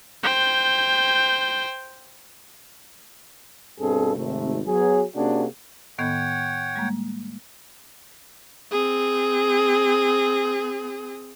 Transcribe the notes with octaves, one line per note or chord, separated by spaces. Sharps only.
C5 G5
G2 B2 C4 G#4 A4
G#1 C3 A3
F#3 B3 G#4
C3 A#3 C#4 D4 F#4 G#4
A2 D#3 B3 C#5 F#5 G5
G3 G#3 A#3
C4 G#4